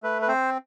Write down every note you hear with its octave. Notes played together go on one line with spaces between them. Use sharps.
A3 B4
B4
C4 C5